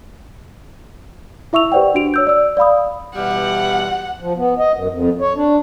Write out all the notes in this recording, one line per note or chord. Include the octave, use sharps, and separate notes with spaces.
E4 E5 C#6 E6 F7
G4 B4 C5 D5 F#5 G5
D4 F#4 D7 F7
C#5 E6 G6
D5 E6
D5 F5 B5 D#6
B2 E3 G3 F#5
F3
B3
D#5
F#2
F2
C#5
D4